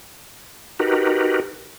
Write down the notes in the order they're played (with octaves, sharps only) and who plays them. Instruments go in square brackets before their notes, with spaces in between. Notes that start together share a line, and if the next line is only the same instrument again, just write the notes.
[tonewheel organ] D#4 F#4 G4 A#4 B4